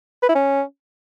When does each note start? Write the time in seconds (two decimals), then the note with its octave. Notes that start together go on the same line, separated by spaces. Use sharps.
0.23 B4
0.29 E4
0.35 C#4